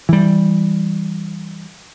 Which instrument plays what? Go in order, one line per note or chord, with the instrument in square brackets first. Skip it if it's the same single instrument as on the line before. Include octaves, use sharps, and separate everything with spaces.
[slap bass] E3 G3